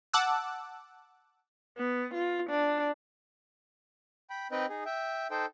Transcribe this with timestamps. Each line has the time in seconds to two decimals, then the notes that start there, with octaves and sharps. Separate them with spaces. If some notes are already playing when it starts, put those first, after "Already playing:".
0.13 F#5 A5 D6 E6 F#6
1.78 B3
2.14 F4
2.50 D4
4.30 G5 B5
4.51 C4 D#4 B4 D#5 G5
4.69 D#4 G#4
4.86 E5 G5
5.31 D#4 A4 C5 G5